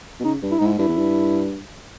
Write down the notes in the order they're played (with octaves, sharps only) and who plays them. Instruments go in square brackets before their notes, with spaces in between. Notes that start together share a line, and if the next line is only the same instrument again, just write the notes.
[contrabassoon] B2
[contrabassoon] C#3 [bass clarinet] D#4
[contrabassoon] G2
[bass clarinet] E4
[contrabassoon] G#2 [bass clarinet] D#4
[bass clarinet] E4
[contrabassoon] G2 [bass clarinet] E4
[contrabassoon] E2
G2